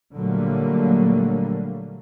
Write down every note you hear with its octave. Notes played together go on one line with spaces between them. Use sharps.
A#2 D3 F#3 G3 A3 A#3